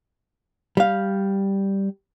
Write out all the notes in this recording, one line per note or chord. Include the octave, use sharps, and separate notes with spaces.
G3 F5